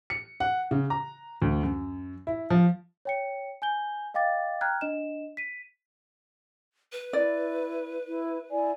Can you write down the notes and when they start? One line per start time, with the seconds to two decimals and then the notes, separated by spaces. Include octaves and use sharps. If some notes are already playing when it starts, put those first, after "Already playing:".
0.10 C#7
0.40 F#5
0.71 C#3
0.90 A#5
1.42 D2
1.63 F#2
2.27 E4
2.50 F3
3.05 C#5 G5 C#7
3.62 G#5 G6 G7
4.14 D#5 F5 G5 D6 A6
4.61 G5 A#5 F6 F#6 G#6
4.81 D4 D#5 E7
5.37 B6 D#7
6.92 B4
7.13 E4 D5
8.08 E4
8.50 E4 D5 G#5